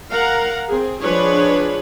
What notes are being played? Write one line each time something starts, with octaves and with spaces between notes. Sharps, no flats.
A#4 F5 F#5 A#5
C4 G#4
F3 D4 G#4 B4 C#5